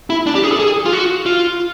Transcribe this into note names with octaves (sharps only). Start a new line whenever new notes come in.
E4
D4
G4
G#4
A4
G#4
F4
F#4
F4